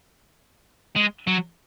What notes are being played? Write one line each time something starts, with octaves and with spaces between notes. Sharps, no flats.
G#3
F#3